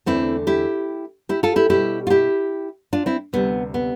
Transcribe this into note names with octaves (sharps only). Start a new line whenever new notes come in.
E2 D3 A3 C4 E4
E4 G4
E4 G4
F4 A4
E4 G4
B2 G3 E4 G4
F4
E4 G4
D4 F4
C4 E4
D2 C3 G3 B3
B3